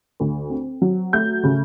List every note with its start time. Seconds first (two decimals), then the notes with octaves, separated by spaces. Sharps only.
0.20 D2
0.50 C4
0.82 F#3
1.13 A3 G6
1.44 C#3